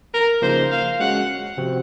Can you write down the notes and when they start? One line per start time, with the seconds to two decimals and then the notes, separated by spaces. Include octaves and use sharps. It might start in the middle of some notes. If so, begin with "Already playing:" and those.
0.14 A#4
0.42 C#3 F3 A#3 D#4 C5
0.71 F5
1.00 G#3 C#4 F#4 F#5
1.58 C3 F3 C4 F#4